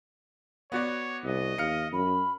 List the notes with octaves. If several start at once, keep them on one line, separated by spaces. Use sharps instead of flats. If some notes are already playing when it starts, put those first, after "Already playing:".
B3 F#4 C#5 D5
C2 D#5
D#2 F5 F6 C#7
F#2 B5